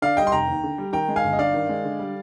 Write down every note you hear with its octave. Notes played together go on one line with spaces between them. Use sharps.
D3 D5 F5
G3 D#5 G5
C6
F1 G5 A#5
D#2
D3
G3
D#3 G5 A#5
G#3
F5 G#5
G1
D#5
G2 D5 F5
D#3
G#3
D3
G3